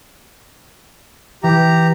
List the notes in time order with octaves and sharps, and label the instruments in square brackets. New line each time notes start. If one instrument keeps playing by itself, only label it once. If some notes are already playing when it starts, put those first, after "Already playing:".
[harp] E3 [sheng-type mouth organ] G4 A#5